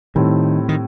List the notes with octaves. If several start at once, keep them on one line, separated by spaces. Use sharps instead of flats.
A2 D#3 G3 C4 E4 A4
D#3